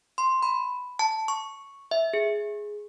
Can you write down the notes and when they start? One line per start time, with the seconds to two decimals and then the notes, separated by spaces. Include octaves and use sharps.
0.18 C6
0.43 B5
0.99 A5
1.28 C#6
1.91 E5
2.13 G#4